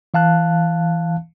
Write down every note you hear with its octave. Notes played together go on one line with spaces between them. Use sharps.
E3 F5 A5 F#6